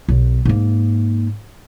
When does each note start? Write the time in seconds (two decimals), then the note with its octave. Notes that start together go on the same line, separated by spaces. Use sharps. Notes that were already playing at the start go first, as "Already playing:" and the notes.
0.08 B1
0.45 G#2 A#3